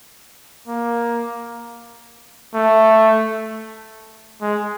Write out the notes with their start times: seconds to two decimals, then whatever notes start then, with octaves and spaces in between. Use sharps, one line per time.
0.68 A#3
2.54 A3
4.41 G#3